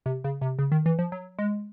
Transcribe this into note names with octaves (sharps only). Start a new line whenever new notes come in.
C3
C#3
C3
C#3
D#3
E3
F3
F#3
G#3